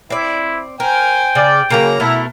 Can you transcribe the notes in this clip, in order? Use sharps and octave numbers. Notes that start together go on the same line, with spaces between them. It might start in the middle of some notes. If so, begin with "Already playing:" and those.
C4 E4 D5
A#4 C5 G5 G#5
C#3 D5
C#3 E3 F#3 A#3 A#5
B2 A3 E4 A#4